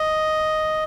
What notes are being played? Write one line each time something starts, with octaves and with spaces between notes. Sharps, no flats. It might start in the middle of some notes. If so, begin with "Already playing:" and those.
Already playing: D#5